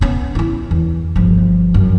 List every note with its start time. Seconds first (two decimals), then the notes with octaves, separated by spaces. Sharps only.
0.01 B3 C#4
0.35 D#4 E4
0.71 E2
1.16 G1 F3
1.74 F#2